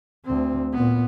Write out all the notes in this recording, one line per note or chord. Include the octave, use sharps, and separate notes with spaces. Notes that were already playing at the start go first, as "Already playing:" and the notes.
D2 C4
A#2 B3